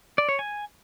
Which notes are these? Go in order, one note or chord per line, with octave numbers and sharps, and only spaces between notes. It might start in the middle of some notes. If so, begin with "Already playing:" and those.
D5
C#5
G#5